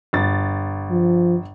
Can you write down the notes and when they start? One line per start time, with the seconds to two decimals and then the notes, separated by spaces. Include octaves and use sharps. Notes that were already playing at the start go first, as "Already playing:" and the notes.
0.13 G1 A6
0.91 F3